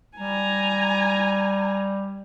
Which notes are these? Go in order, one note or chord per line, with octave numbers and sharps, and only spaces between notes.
G3 G#5 A#5